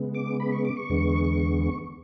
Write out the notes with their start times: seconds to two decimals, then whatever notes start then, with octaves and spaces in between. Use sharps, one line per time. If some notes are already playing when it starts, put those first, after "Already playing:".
Already playing: C#3 G#3 B3
0.15 D6
0.40 B5
0.52 C#6
0.65 D6
0.77 C#6
0.89 E2 D3 G#3 B3